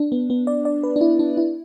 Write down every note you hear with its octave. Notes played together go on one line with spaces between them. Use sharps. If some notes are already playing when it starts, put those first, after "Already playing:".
Already playing: D4
B3
B3
D5
D5
B4
D4
E4
D4
E4